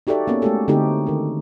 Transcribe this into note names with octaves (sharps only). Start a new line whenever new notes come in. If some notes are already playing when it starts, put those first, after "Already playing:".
D#4 F#4 G4 A4 D5 E5
A#3 B3 C#4
G#3 A3 B3 F#4 G4 A4
D3 A3 C4 D#4 F#4 G4
D#3 A4